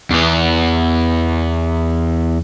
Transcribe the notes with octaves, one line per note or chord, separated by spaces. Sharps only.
E2 B3